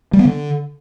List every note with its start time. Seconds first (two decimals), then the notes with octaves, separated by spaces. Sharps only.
0.13 G3
0.19 B3
0.25 D3